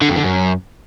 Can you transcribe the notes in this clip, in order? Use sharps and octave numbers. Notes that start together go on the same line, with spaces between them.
D3
F2
D3
F#2